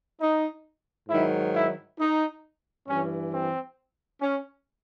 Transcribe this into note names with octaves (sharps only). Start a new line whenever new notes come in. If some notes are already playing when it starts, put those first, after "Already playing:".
D#4
G#2 D#3 F#3 E4
E4
D#4
G2 E3 C#4
C4
C#4